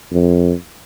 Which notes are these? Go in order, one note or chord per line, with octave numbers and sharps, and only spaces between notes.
F2